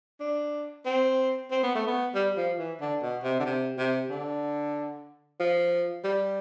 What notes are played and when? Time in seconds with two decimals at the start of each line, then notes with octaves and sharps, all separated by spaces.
0.21 D4
0.86 C4
1.51 C4
1.63 B3
1.75 A3
1.87 B3
2.15 G3
2.37 F3
2.59 E3
2.80 D3
3.02 B2
3.23 C3
3.40 D3
3.45 C3
3.78 C3
4.10 D3
5.40 F3
6.04 G3